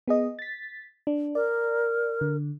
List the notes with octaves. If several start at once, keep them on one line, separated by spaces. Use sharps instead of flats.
B3 G#4 D#5
A6 B6
D4
A#4 D5
D3